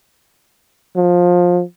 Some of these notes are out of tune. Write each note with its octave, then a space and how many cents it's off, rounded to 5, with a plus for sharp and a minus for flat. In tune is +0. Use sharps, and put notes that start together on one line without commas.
F3 +20